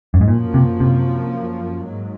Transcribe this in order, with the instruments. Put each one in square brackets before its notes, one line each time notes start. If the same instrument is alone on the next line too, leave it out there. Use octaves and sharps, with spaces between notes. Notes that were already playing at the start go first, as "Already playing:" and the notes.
[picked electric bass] F#2
G#2
[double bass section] F#2 F3 A#3 [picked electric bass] A#2
[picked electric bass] C3
C3
[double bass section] G#2 F#3